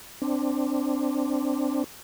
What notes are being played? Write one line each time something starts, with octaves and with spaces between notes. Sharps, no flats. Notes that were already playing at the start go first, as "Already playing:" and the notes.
C4 D4